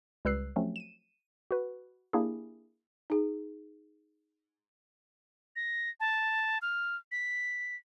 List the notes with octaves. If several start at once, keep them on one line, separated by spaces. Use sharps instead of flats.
C#2 G3 B4 E6 F#6 C7
F3 F#3 A3 C4 C#4
D#7 E7
F#4 B4
A#3 D4 E4 G4 G#4
D#4 G#4
A#6
A5
F6
B6